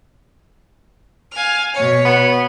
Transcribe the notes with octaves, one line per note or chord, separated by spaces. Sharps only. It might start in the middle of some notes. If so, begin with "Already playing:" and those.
F5 G#5 F6
B2 C#5
B3